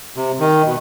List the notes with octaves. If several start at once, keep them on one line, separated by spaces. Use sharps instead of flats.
C3
D#3
B2